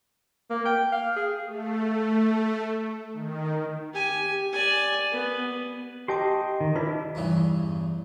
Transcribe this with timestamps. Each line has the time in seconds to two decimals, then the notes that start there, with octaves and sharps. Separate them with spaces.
0.51 A#3
0.66 G5
0.93 F5
1.17 G#4
1.47 A3
3.14 D#3
3.93 G4 G#5
4.53 D5 G#5
5.12 B3
6.08 G4 D#5 G5 A5 C6 D6
6.61 D#3
6.76 D4 E4 F4 B4 D#5
7.15 E2 G2 C#3 E3